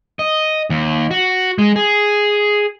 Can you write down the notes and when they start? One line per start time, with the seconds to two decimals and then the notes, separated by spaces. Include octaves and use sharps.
0.19 D#5
0.70 D#2
1.11 F#4
1.58 G#3
1.76 G#4